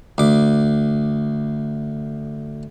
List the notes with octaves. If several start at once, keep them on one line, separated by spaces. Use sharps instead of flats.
D2 D6